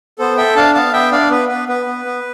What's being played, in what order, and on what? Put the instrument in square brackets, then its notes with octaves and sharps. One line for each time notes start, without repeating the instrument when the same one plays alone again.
[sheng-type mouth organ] B3 A4 C5
A4 E5 G5
D4 F5 A5
B3 F5 A5
B3 E5 G5
D4 D5 F5
B3 B4
B3 B4
B3 B4
B3
B3